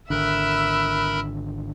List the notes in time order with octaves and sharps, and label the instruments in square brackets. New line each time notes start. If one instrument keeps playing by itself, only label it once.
[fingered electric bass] G#1 D3 [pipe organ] A#4 B5 F#6 [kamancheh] E5 E6